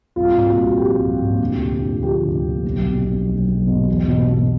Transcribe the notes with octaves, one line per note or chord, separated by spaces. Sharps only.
C2 F4
A#2
F#4
C2
F3 G4
C2
A#2
D2
C3
D2
F3 G4
D2
C3
B1
B2
B2
B1
B1
B2
E2
B2
B2